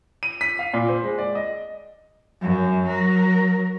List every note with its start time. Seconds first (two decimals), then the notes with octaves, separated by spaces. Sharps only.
0.23 D#7
0.41 B6
0.59 F5
0.74 A#2
0.89 C5
1.04 G#3
1.18 D5
1.35 D#5
2.42 F#2
2.85 F#3 A#4